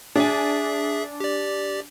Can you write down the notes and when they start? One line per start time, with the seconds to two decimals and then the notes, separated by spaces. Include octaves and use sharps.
0.16 D4 G#4 E5 G#5
1.20 G4 D5